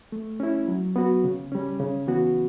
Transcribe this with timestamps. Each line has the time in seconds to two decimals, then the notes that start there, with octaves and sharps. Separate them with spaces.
0.12 A3
0.40 C#4 E4
0.68 F#3
0.96 B3 F#4
1.24 C#3
1.52 G3 C#4
1.80 C#3
2.07 E3 B3 F#4